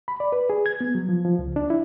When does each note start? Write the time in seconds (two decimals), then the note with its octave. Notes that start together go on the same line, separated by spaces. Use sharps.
0.08 B5
0.20 D5
0.32 B4
0.50 G#4
0.66 G#6
0.81 B3
0.95 F#3
1.09 F3
1.25 F3
1.39 C#2
1.56 D4
1.70 E4